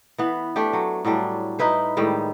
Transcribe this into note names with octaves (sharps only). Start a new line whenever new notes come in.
E3 B3
A3 D4 G4
F#3
A2 F#3 G3 D4
D#4 E4 B4 C5
A2 D#3 G3 G#3